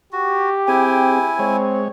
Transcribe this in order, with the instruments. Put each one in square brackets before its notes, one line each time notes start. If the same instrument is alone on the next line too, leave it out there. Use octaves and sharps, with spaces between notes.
[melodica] F#4 [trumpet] G4
[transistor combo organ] C4 G#4 [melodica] E4 G#5 [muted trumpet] G5
[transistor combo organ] G#3 C#5 [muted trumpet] C4